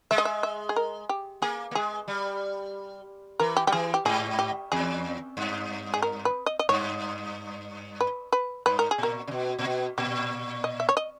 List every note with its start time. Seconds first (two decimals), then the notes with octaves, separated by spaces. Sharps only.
0.11 G#3 E5
0.18 D#5
0.25 E5
0.43 E5
0.69 G#4
0.76 A#4
1.09 G4
1.42 A#3 G#4
1.71 A#3
1.75 G#3 G#4
2.08 G3
3.40 E3 A#4
3.57 G4
3.67 G3 G4
3.72 E3 G#4
3.94 G4
4.05 G#2 G#4
4.39 G4
4.72 E2 G#4
5.37 G2
5.94 G#4
6.02 A#4
6.25 B4
6.46 D#5
6.59 D#5
6.69 G2 C#5
8.01 B4
8.33 B4
8.66 G2 B4
8.79 A#4
8.91 G#4
8.98 A#2 A#4
9.27 C#3
9.31 B2
9.59 A#2
9.64 B2
9.98 A#2 G4
10.64 D#5
10.80 E5
10.89 C#5
10.97 D#5